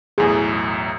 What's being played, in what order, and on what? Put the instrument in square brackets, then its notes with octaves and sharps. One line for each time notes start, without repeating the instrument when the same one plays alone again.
[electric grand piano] B1 E2 A2 [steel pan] G#4